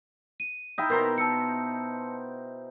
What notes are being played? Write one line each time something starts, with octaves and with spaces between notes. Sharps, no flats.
D#7
D#4 E4 G5
B2 A#4 C5 A#5
A5 E6 C#7